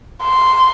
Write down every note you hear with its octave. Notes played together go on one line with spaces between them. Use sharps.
C6